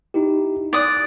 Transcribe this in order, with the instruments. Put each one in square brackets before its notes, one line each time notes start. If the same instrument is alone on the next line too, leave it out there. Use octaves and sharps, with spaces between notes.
[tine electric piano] D#4 E4 G4
[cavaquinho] D5 D#6 [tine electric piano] F#6 A6